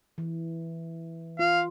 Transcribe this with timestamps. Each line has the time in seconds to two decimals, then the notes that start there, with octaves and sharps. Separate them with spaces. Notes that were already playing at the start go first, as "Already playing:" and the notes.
0.18 E3
1.39 F4 F5